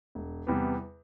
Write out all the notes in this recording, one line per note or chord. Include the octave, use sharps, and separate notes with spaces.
E1
E2 C3 G3 B3